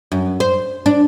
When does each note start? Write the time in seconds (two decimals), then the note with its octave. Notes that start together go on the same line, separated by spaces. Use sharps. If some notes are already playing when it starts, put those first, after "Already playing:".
0.12 F#2
0.40 C5
0.86 D4